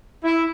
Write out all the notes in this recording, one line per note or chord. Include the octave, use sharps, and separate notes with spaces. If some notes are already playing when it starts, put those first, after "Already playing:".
E4